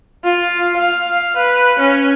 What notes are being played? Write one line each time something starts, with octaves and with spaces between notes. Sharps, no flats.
F4
F5
B4
C#4